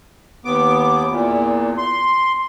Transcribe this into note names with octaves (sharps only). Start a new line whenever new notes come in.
D#2 B3 D6
E2 A#2
C6